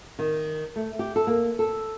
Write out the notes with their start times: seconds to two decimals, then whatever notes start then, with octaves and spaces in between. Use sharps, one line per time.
0.19 D#3
0.76 A3
0.99 G4
1.16 A4
1.27 A#3
1.59 A4